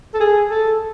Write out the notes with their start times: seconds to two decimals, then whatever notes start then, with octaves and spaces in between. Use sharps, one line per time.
0.14 A4
0.20 G#4
0.51 A4